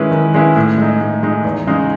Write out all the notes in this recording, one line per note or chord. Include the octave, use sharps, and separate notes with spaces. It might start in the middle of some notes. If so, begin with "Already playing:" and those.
Already playing: D#3 G#3 C#4 E4 B4
D#3
G#3 C#4 E4 B4
A2
G#3 D#4
A2
G#3 D#4
E2
C#3 G#3 D#4